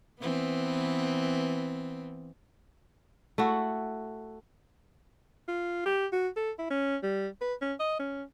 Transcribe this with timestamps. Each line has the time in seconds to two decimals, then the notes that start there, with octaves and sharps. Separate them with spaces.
0.20 E3 B3 C4
3.38 A3 E4 F#4
5.48 F4
5.86 G4
6.13 F#4
6.36 A4
6.58 E4
6.70 C#4
7.03 G3
7.41 B4
7.62 C#4
7.79 D#5
7.99 C#4